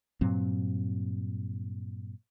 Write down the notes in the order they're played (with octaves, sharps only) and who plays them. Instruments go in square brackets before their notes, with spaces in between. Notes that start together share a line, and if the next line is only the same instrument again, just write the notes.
[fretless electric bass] G2 A#2 F#3 C4